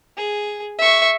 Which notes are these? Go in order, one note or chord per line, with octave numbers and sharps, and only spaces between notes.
G#4
E5 C#6